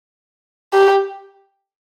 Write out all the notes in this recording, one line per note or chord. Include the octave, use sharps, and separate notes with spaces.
G4